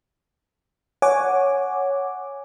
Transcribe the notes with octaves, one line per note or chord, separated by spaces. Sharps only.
C#5 F#5 G#5 D6